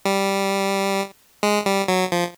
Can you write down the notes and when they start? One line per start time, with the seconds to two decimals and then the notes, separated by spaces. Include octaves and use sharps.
0.05 G3
1.43 G#3
1.66 G3
1.88 F#3
2.12 F3